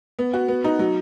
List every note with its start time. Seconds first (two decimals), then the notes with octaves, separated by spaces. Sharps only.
0.19 B3
0.34 F#4
0.48 B3
0.64 D#4
0.79 F#3